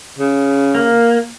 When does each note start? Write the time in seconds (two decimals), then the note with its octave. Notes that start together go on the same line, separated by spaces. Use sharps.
0.19 C#3
0.75 A#3